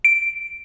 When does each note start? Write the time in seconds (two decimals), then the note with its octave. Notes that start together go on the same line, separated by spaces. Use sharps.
0.05 D7